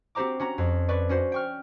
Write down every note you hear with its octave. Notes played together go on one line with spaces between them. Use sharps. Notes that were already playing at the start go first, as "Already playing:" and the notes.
C4 F#4 G4 C5 A#5 D6
C#4 F#4 A#5
F2
B4 D5 C#6
C#4 F#4 C5
G5 C#6 F6